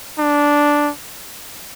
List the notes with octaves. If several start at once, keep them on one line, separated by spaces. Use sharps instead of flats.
D4